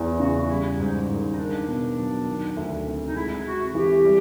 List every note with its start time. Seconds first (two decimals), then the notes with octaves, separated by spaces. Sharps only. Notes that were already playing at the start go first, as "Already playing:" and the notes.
Already playing: E2 E3
0.20 C#3 F#4
0.49 G3 E4
0.79 G#2 D#4
1.09 D#3
1.33 D#4
1.38 A#3 D4
1.68 B2
1.97 F#3
2.27 D#3
2.57 D2
2.86 C3
3.08 D#4
3.15 G#3 E4
3.45 C3 F#4
3.74 E3 G4
4.05 G3